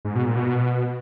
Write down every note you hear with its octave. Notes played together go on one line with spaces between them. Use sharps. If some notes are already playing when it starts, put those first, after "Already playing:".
G#2
B2
A#2
B2